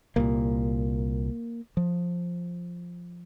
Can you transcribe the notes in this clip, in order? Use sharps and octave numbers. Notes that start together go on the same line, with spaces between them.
C2 A#2 A#3
F3